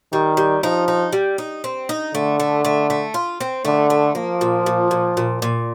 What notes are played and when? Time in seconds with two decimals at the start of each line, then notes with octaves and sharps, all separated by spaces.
0.12 D#3 G3
0.37 G3
0.63 F3 D#4
0.88 D#4
1.13 G3
1.38 D#4
1.64 C4
1.89 D#4
2.14 D3 A3
2.40 A3
2.65 A3
2.90 A3
3.14 F4
3.40 C4
3.65 D3 A3
3.90 A3
4.15 F3 A#3
4.41 A#2
4.66 A#2
4.91 A#2
5.17 A#2
5.42 A#2